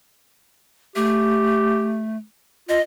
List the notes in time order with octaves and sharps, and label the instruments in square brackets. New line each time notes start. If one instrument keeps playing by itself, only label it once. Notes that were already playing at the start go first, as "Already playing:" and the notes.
[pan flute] A3 [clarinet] G4
[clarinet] F4 [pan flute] D#5